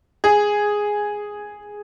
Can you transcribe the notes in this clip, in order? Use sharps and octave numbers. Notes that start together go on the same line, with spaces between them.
G#4